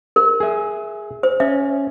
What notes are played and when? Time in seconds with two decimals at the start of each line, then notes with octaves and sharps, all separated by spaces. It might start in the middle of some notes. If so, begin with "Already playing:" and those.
0.16 A#4
0.40 G#4 E5
1.23 C5
1.40 C#4 E5